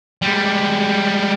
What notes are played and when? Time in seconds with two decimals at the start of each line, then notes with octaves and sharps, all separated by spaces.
0.22 G3 G#3